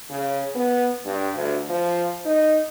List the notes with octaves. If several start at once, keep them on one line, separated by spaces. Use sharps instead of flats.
C#3
B3
G2
D2
F3
D#4